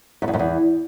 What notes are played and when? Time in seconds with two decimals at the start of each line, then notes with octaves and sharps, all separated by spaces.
0.22 F#2
0.28 E2
0.33 F#2
0.39 E2